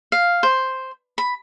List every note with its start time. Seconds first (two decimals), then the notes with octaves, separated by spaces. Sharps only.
0.12 F5
0.43 C5
1.18 B5